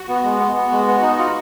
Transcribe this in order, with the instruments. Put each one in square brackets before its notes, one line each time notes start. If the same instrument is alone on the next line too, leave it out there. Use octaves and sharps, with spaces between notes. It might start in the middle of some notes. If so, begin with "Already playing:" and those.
Already playing: [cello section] F#4
[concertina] B3
G#3
B3
[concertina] B3 [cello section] F#4
[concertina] G#3
B3
D#4
F4